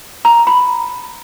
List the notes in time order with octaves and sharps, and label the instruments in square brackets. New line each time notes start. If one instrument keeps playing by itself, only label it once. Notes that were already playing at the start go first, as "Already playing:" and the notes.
[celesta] A#5
B5